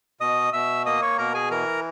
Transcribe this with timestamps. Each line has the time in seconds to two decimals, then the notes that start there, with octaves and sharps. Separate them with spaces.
0.21 B2 D#5 D#6
0.53 B2 E5 E6
0.86 A#3 D#5 D#6
1.02 C#5 C#6
1.18 B2 A#4 A#5
1.34 G#4 G#5
1.51 E3 A#4 A#5